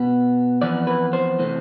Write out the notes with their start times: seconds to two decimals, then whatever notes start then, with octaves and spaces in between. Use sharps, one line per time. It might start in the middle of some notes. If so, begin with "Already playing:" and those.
Already playing: B2 B3
0.62 F2 E3 B3 D5
0.87 B4
1.13 C5
1.39 C3 E3 A3 C4